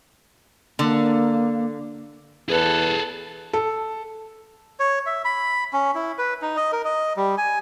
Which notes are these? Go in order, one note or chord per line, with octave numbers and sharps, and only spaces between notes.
D3 A#3
E2 G#4 A4 B4 A5 B5
A4
C#5
E5
B5
C#4
E4
B4
D#4
D#5
A#4
D#5
G3
G#5